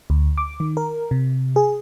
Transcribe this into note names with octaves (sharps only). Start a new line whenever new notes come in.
D2
D6
D#3
A#4
C3
G#4